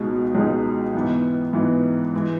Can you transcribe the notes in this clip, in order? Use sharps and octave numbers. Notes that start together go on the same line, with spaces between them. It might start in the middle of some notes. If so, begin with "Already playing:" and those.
Already playing: C#2 B2 G#3 D#4 G#4
C#2 B2 G#3 D#4 G#4
G#2 E3 B3
G#2 E3 B3
E3 G#3